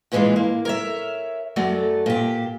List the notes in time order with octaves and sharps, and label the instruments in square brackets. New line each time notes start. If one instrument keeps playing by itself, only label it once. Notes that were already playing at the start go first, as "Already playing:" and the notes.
[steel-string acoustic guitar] G2 A#2 E3 G3 G#3 F4
A#3
A#4 C#5 E5
F#2 F#3 A3 D5
A#2 G4